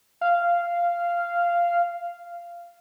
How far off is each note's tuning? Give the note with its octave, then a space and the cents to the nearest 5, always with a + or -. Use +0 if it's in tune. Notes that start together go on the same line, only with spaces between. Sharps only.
F5 -10